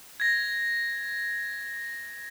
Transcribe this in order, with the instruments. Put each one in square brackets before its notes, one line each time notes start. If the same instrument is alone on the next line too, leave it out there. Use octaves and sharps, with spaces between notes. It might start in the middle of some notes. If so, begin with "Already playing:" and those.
[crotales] G#6 A#6